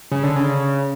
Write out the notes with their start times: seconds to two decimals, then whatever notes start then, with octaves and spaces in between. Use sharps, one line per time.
0.12 C#3
0.23 D3
0.36 C#3